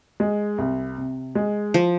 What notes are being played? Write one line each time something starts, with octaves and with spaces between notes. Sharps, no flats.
G#3
C2
C3
G#3
F3